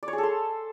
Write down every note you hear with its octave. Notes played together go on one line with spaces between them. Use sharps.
D5
C#5
G#4
A4
C6